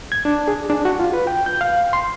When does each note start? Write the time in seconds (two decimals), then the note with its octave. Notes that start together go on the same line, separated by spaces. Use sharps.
0.12 G#6
0.25 D4
0.48 G#4
0.70 D4
0.85 F#4
0.99 F4
1.13 B4
1.27 G5
1.46 G6
1.61 F5
1.93 C6